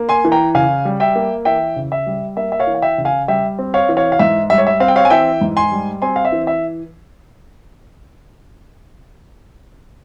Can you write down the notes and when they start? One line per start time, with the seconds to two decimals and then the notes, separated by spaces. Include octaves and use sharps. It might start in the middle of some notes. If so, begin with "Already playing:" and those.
Already playing: A#3
0.09 G#5 C6
0.25 E3
0.32 G5 A#5
0.55 C#3 F5 G#5
0.85 G3
1.00 E5 G5
1.16 A#3
1.45 E3 E5 G5
1.76 C#3
1.92 E5
2.07 G3
2.37 A#3 E5
2.52 E5
2.59 C#5 F5
2.67 E3
2.75 F5
2.82 E5 G5
2.98 C#3
3.05 F5 G#5
3.28 G3 E5 G5
3.59 C4
3.74 C#5 F5
3.89 E3
3.97 C#5 F5
4.12 F5
4.19 G#2 E5
4.50 G3 E5
4.58 C#5
4.67 E5
4.80 C4 F5
4.88 G5
4.96 C#5 F5
5.05 G#5
5.10 E3 E5 G5
5.41 G#2
5.57 G#5 C6
5.72 G3
6.02 C4 G#5 C6
6.16 F5
6.25 E5
6.32 E3
6.47 E5